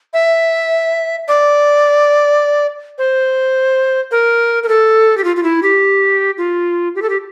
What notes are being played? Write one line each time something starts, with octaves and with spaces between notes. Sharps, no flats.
E5
D5
C5
A#4
A#4
A4
G4
F4
F4
E4
G4
F4
G4
A4
G4